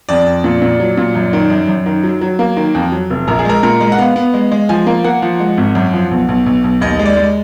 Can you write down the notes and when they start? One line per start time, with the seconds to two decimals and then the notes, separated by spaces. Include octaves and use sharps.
0.09 F2 D5
0.27 F2
0.44 A#2
0.62 A#2
0.80 F#3
0.97 A#2
1.15 F#2
1.33 D#3
1.50 F#2
1.68 F#2
1.86 D#3
2.04 F#3
2.21 F#3
2.39 A#3
2.57 D#3
2.75 F2
2.92 F#3
3.10 F1
3.28 A#1 A#4
3.39 G#4
3.45 G#3 A#4
3.63 A#2 A#4
3.81 G#3
3.92 F#5
3.98 B3 F5
4.16 B3
4.34 G#3
4.52 G#3
4.69 F3 G#5
4.87 A#3
5.04 A#3 F#5
5.22 F3
5.40 G#3
5.57 G#1
5.75 F#2
5.93 F3
6.11 B1
6.29 B1
6.46 B1
6.64 B1
6.81 D#2 D#5
6.99 G#3
7.06 D5
7.17 G#3